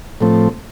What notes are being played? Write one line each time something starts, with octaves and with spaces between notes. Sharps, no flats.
A2 F3 A3 C4